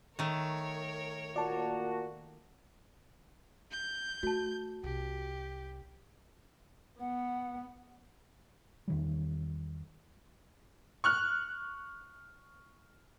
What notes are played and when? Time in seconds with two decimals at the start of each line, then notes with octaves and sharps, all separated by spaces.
0.19 D#3 A3 A#4 C#5
1.36 A#2 A#3 F#4 D5 A5
3.71 G6
4.23 A3 F#4 A5
4.84 C2 G4
7.00 B3 F#5
8.88 E2 D#3 G3
11.04 C#6 F6 F#6